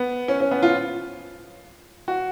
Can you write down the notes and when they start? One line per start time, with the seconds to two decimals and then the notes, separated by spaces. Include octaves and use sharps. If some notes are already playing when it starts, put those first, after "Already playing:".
Already playing: B3
0.28 C#4
0.40 C#4
0.51 B3
0.62 F4
2.08 F#4